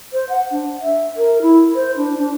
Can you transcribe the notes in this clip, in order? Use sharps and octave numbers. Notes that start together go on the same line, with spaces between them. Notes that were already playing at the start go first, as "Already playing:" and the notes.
C5
F#5
D4
E5
A#4
E4
C5
D4
D4